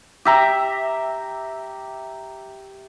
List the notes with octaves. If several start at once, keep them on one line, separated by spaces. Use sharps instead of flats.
G4 E5 A#5